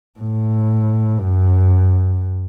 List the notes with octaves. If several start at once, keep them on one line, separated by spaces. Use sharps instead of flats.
A2
F#2